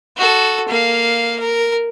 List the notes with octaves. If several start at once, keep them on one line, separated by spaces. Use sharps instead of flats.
F#4 A4
A#3 F5
A#4